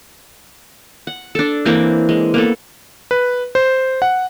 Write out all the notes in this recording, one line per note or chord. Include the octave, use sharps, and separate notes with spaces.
F#5
D4 A4
E3 A#3 C4 D4
G#3
A#3 B3 A4
B4
C5
F#5